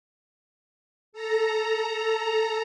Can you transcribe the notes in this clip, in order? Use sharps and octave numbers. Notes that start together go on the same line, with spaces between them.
A4 A#5